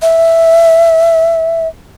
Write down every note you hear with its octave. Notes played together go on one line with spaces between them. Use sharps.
E5